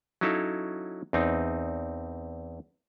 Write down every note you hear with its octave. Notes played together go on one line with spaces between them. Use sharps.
F#3 C#4 D#4 E4 A4 F5
E2 C4 D#4